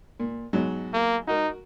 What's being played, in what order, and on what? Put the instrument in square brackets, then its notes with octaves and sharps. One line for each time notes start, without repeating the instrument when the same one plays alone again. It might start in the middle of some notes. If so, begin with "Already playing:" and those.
[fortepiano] A#2
G#2 B2 F#3
[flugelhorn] A#3
[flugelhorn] D#4 [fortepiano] F#4 A#4